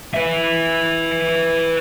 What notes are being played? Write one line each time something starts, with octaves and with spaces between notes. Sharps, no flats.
B4 E5